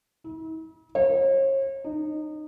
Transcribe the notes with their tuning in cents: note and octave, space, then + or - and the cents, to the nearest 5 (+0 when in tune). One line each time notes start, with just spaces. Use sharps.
E4 -45
C#5 -40
D#4 -25